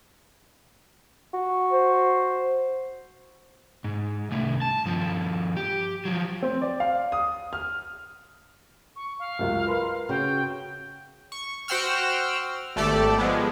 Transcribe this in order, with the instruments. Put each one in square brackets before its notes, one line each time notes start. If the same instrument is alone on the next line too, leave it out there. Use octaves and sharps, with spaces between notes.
[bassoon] F#4
[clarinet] C5
[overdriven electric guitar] G#2
C2 A3
A5
G2 F3
G4
F3 F#3
[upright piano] C4
D5
F5
D#6
F6
[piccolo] C#6
F5
[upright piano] C#2 F#2
A#4 B4 C6
[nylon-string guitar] C#3 [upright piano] F#4 [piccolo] G5
[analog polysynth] C#6
F#4 C5 F#5 G5 E6 F6
G#1 A3 G4 A4 D5
F3 G#3 B3